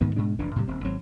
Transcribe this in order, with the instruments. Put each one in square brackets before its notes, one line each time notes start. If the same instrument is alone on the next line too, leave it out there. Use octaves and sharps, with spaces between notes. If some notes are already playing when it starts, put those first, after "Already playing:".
[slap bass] D2 G#2 D#3 B3
G#2 B2 G#3 D4
F1 F2 E3 D4
A2 C3 G3
D#1 C4
G#1 F#3 C4